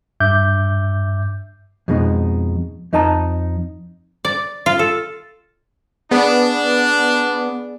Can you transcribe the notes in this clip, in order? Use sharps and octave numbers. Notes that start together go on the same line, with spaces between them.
G2 E5 D6 G6
F2 B2 G#3 D#4
F2 D#4 D#5 A5 A#5
D5
F4
A4
B3 D4 G#4 D5